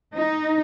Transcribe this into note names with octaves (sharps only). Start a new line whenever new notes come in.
D#4